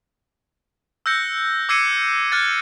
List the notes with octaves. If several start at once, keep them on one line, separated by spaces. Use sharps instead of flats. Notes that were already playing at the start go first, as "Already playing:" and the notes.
E6 F#6 G6 A#6 C#7
D6 E6 G#6 C7 C#7 D#7
F6 F#6 G#6 A6